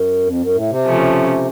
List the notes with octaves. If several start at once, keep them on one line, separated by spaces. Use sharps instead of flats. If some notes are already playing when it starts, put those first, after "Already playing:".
Already playing: F#2
F2
F#2
A2
C3
C#3 F3 A3 C#4